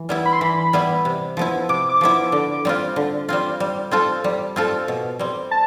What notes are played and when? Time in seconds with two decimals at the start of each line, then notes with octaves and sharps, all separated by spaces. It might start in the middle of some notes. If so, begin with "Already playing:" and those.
Already playing: E3
0.09 G3 B3 E4
0.26 B5
0.33 C6
0.40 E3 B5
0.73 G3 B3 E4
1.05 C3
1.37 F3 B3 E4
1.69 C3 D6
1.89 D6
2.01 F3 B3 E4
2.32 D3
2.65 G3 C4 F4
2.96 D3
3.29 G3 C4 F4
3.60 G3
3.91 C4 F4 A4
4.24 G3
4.56 C4 F4 A4
4.88 B2
5.19 G3 C4
5.51 A5